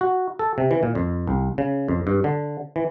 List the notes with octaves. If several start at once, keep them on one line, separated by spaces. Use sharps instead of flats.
F#4
A4
C3
E3
A#2
F2
C2
C#3
F2
G2
D3
E3